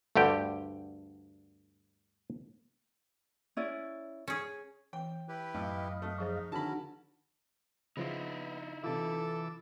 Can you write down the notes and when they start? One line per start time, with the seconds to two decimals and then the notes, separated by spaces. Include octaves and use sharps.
0.16 D2 G2 D3 G4 G5
3.57 C#4 E4 D5
4.28 C#4 G#4
4.93 E3 G5
5.28 E4 G4 B4
5.54 F#2 A2 D#5 F5
6.02 A3
6.18 F3 D#4 G#4 C5
6.52 D3 D#3 C#4 E4 F#4 A#4 A5 B5
7.97 C#3 F3 B3 D#4 E4 C6
8.84 C3 E3 F4 A4 D6 E6